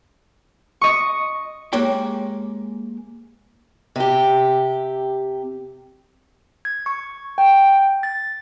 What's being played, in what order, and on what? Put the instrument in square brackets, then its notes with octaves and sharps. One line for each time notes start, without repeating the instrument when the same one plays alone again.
[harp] D#5 C#6
[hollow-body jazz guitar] G#3 A#3 G4 C#5 G5
[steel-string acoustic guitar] C3 G4
[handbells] G#6
C#6
G5
A6